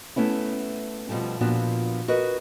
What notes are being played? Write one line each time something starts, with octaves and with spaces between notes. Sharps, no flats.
A3 B3 C#4 E4
B2 D3 F3 G3 A3
A#2 F3 B3 D4 F#4
F#4 A#4 B4 D#5